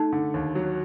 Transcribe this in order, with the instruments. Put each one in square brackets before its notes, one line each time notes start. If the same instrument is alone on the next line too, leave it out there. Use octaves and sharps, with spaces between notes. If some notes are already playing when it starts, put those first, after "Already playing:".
Already playing: [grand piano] A3 [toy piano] D#4
[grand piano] D3
D#2
F#3